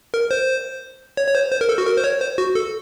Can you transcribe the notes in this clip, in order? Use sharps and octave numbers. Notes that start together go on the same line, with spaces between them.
A#4
C5
C#5
C#5
C5
C5
A#4
A4
F#4
A#4
C5
C#5
C5
F#4
A4